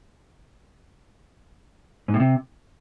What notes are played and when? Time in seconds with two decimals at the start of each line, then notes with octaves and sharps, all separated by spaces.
2.08 G#2
2.14 A2
2.20 C3